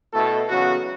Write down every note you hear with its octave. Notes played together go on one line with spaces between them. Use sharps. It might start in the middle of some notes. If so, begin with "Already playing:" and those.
B2 A3 E4 A4
E2 C#3 F#3 B3 F#4